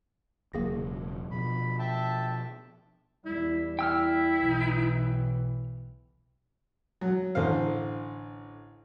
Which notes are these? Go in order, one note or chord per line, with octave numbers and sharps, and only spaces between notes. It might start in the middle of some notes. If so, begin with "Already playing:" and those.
E1 C#3 F#3 A#3 G#4 A#6
B2 F3 B5
E5 G5 A5
E2 G3 E4
E4 G5 E6 F6
B1 E3
F#3
A1 D3 C5 F5